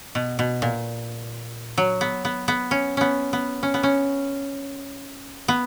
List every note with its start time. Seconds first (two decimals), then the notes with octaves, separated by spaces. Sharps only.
0.15 B2
0.39 B2
0.62 A#2
1.77 F#3
2.01 B3
2.25 B3
2.48 B3
2.71 C#4
2.97 B3 C#4
3.33 B3
3.63 C#4
3.74 B3
3.83 C#4
5.48 B3